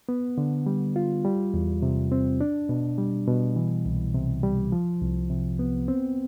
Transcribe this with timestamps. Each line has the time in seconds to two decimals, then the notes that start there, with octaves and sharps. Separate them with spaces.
0.09 B3
0.38 D3
0.66 G3
0.96 F4
1.24 G3
1.54 E2
1.82 C3
2.12 C4
2.41 D4
2.69 B2
2.98 G3
3.27 B2
3.56 E3
3.85 C2
4.15 C3
4.43 G3
4.72 F3
5.01 C2
5.30 C3
5.59 B3
5.88 C4